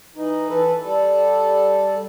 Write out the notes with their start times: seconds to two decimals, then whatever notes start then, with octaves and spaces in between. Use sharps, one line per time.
0.16 E3 D#4
0.49 E3 A4 B4
0.83 G3 A4